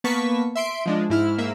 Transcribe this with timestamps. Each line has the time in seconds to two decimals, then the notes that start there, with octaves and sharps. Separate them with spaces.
0.04 A#3 B3 B4 A5 C#6 B6
0.56 E5 C6 D7
0.86 F3 G#3 D4
1.10 G#2 E4 F6
1.38 G#2 A#3 E5